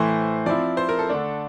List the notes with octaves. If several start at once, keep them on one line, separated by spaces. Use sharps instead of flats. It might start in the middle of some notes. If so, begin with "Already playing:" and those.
Already playing: A2 E3 A3 E4 C5
F3 C4 E4 D5
C5
A#4
A4
D3 A3 D4